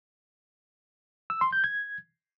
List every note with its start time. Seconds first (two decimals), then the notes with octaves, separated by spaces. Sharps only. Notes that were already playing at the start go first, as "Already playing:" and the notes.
1.30 E6
1.41 C6
1.53 G6
1.64 G#6